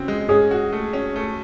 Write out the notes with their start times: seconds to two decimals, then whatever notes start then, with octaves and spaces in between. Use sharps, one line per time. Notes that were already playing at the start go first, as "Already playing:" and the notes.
Already playing: C#3 C4 F#4
0.08 G#3
0.29 C#4 G#4
0.51 F#4
0.73 A3
0.93 C#4
1.16 A3